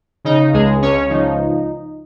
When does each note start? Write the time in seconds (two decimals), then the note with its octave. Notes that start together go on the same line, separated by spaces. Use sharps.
0.24 C#3 D#4
0.53 C#2 G#3 G#4
0.82 C#2 C#4 C#5
1.10 F3 D#4